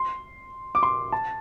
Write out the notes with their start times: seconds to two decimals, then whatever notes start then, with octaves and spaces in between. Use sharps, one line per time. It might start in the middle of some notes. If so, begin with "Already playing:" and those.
Already playing: C6
0.75 D6
0.83 C6
1.12 A5